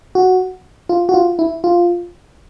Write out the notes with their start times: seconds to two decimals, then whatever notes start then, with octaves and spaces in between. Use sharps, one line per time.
0.15 F#4
0.89 F4
1.09 F#4
1.14 F4
1.39 E4
1.64 F4